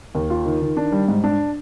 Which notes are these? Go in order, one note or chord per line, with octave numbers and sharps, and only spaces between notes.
D#2
F4
D#3
D#3
D4
G3
G#2
D4